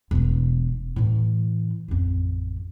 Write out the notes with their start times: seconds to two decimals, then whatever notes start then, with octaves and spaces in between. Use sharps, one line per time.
0.11 E1 A3
0.96 A2 E3
1.88 A1 F2